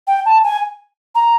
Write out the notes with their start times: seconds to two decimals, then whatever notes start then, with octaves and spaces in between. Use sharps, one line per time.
0.07 G5
0.25 A5
0.43 G#5
1.15 A#5